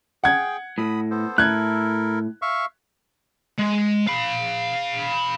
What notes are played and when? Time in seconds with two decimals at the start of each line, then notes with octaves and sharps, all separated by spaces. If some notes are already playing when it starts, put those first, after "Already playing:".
0.24 G#4 F#5 G5 G#6
0.78 A2 B5 D#6
1.11 B3 A4 C5
1.38 A2 E4 A4 A#4 F#6 G#6
2.42 E5 F5 C#6
3.59 G#3
4.07 F5 B5